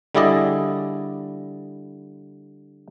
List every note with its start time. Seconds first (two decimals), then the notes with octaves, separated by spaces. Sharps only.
0.15 D3 G3 E4 G#4 D5 D#5